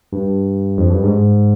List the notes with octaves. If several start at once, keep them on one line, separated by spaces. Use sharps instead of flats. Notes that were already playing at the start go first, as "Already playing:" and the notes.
G2
F2
G2
G#2